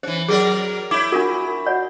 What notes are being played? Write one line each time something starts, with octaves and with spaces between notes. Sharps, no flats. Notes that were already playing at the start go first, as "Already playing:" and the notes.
E3 C#4 C5
F#3 G#4 A#4 D5
E4 C#5 D6
D4 F4 F#4 A#4
C#5 D5 F#5